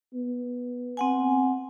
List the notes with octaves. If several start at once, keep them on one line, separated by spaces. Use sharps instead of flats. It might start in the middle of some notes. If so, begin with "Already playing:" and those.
B3
C4 F#5 G#5